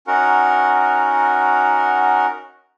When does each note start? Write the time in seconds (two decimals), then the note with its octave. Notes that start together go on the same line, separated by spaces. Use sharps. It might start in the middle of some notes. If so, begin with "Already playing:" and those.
0.07 C#4 D#4 F#4 A#4 F#5